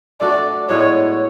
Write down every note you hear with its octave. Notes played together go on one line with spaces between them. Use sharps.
A3 D4 F#4 D5
A2 G#3 B3 F#4 C#5